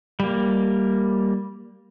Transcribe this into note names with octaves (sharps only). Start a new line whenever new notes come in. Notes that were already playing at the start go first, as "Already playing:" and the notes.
G3 A#3